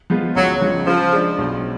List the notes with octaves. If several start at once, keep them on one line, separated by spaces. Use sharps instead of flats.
F3 G#3 B3 F4
C#2 F#3
C#3 F3 G#3
C#3 F3
G#3 D4
B1